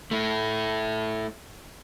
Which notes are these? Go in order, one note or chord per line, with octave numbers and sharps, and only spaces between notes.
A3 E4